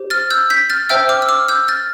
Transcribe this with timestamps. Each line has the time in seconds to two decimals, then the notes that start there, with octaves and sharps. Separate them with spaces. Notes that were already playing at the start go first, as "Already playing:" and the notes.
Already playing: G4 C5
0.10 F6 A6
0.30 E6 G6
0.50 G6 B6
0.70 F6 A6
0.89 C5 E5 G5 E6 G6
1.09 D6 F6
1.22 E6
1.29 D6 F6
1.48 E6 G6
1.68 F6 A6